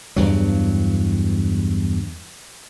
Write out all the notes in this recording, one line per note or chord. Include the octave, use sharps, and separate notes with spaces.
E2 G2 F#3